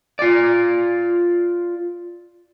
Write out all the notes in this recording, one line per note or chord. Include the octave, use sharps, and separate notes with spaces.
F4 D5